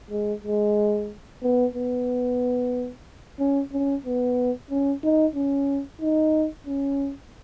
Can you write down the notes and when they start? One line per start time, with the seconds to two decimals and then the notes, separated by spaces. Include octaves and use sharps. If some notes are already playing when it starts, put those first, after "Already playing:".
0.11 G#3
0.44 G#3
1.43 B3
1.75 B3
3.39 C#4
3.73 C#4
4.05 B3
4.71 C#4
5.03 D#4
5.36 C#4
6.02 D#4
6.67 C#4